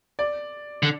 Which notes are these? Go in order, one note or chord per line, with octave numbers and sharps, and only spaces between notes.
D5
D3